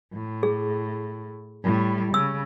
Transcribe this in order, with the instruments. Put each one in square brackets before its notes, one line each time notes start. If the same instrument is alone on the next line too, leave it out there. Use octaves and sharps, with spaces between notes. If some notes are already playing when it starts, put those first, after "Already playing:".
[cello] A2
[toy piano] G#4
[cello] A2 G3
[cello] C#3 [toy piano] E6